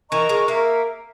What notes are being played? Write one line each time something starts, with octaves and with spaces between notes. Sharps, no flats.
E3 A#4 D#5 A#5 C#6
G#3
A#3 A#4 E5